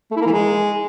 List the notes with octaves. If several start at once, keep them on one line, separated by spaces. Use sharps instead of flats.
A3
E4
A#3
E3
G#3